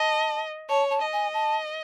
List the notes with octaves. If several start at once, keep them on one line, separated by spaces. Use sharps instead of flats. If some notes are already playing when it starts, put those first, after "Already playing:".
Already playing: D#5 A5
C#5 A5
A5
D#5
G#5
A5